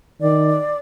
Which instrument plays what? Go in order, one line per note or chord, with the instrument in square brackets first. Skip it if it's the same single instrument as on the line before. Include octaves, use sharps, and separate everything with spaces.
[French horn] D#3 [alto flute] D5